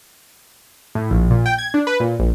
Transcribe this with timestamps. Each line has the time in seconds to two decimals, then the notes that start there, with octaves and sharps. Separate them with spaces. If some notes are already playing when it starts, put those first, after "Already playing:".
0.95 A2
1.11 A#1
1.30 A#2
1.46 G5
1.58 G#6
1.74 D4
1.87 B4
2.00 A#2
2.19 A#1